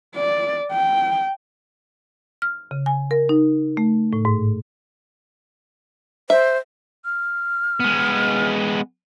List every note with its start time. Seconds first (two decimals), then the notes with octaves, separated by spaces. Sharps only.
0.16 D5
0.72 G5
2.42 F6
2.71 C#3
2.86 G#5
3.11 A#4
3.29 D#4
3.77 A3
4.13 A2
4.25 G#2
6.30 C5 E5
7.05 F6
7.80 G#3 B3